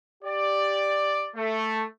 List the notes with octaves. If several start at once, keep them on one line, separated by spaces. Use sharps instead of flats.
G4 D5
A3